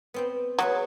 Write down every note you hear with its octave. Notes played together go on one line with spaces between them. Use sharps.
B3 C4 G5
F#3 G#4 B4 C#5